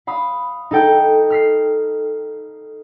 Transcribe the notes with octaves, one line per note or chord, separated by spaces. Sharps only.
F5 B5 D#6
D#4 A4 G5
F6 B6 C7